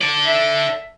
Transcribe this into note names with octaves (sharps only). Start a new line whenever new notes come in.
A4 D5
E5